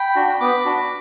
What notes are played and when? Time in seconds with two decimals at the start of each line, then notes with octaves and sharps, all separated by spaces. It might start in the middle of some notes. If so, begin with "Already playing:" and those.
Already playing: G5 B5
0.16 D4 F#4
0.41 B3 B5 D6
0.66 D4 F#4